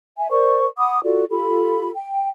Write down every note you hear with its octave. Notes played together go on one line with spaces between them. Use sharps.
E5 G#5
A#4 C5 D5 C#6
F#5 B5 D6 D#6
F4 F#4 A4 D5
F4 G4 A4 B5
G5